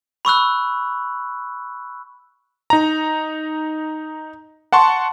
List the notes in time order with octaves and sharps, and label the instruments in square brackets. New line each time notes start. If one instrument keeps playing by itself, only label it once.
[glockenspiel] B5 C#6 E6 F#6
[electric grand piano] D#4 A#5
F#5 A5 C6 C#6